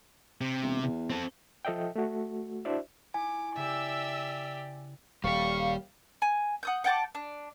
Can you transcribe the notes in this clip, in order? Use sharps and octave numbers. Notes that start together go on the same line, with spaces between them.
C3
E1
E2
C4 A4
F3 A4 D#5 E5 G5
A3 F#4
D4 E4 F#4 C5 D5 E5
E4 G#5 D6
C#3 G4 D5 E5 E6
D#1 G3 G4 F5 C#6
G#5
F#5 D#6 G6
F#5 G5 A5 D6
D4